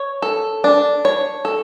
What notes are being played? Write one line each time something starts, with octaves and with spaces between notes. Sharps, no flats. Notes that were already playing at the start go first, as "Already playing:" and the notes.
Already playing: C#5
A4
D4
C#5
A4